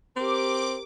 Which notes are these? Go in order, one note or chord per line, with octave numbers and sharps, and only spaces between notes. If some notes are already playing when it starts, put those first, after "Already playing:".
C4 G4 A#4 D6